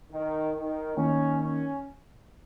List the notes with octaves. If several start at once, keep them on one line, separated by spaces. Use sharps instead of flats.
D#3
D#3
D#3 A#3 C#4 D#4
C#4